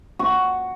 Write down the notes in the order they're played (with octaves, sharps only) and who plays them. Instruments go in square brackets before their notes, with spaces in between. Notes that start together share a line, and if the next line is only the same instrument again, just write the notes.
[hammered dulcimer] F#4